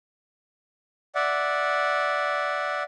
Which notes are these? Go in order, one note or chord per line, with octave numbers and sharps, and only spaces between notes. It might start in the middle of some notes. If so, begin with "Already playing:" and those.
D5 E5 F#5